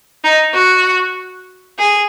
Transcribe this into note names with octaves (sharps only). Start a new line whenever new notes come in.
D#4
F#4
G#4